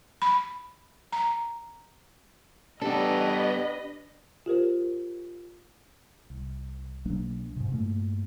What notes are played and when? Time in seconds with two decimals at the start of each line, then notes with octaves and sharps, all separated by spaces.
0.22 B5
1.12 A#5
2.82 B3 D4 G4 A4 B4 D#5
4.46 F4 G4 A#4 C5
6.30 C2
7.05 B1 F#3 A#3 D4
7.56 G#2 C3
7.72 G2 A#2 A3 A#3